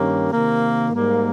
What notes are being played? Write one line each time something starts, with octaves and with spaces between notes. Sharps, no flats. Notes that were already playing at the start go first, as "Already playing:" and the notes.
Already playing: G2 D#3 A#3 C#4 G4
C3 D#3 A#3
G#2 G3 A#3